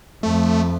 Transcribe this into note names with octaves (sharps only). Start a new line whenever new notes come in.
F2 A3